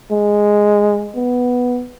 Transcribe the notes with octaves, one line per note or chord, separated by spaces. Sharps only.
G#3
B3